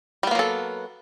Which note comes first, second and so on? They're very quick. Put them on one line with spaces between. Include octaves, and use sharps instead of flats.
G3 B3 A#3 F#3 A4